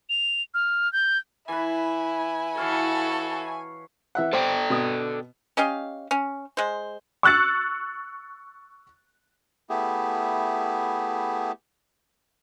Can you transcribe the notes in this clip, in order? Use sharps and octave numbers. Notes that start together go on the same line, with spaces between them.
F7
F6
G6
E3 E4 B4 G#5
E3 F#4 A4 C#5 F5
E3 E5 F#5
A4 C5 D5 G5
B2 D#6
C#4 G4 D#5 F5
C#4
G#3 C5
C#6 E6 F#6 A6 C#7
A3 B3 E4 G4 G#4